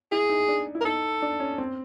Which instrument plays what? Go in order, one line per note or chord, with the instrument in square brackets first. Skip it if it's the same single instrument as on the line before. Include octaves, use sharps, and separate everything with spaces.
[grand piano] E4 [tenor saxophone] G#4
[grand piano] D#4
D4
E4
[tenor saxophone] A#4
[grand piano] D#4 [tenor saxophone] A4
[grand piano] D4
C#4
C4